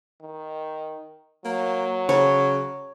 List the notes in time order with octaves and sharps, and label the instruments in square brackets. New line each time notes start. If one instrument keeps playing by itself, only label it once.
[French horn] D#3
[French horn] F#3 [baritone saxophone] A#3
[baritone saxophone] C#3 [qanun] C#5